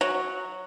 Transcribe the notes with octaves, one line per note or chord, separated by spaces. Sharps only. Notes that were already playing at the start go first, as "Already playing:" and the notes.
F#3